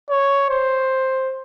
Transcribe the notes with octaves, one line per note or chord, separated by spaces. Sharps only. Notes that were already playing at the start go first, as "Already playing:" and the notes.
C#5
C5